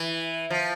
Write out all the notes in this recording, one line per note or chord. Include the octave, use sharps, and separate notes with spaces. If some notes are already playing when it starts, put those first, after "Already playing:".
Already playing: E3
F3